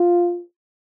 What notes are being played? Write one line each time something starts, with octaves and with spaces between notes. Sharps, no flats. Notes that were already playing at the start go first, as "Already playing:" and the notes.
Already playing: F4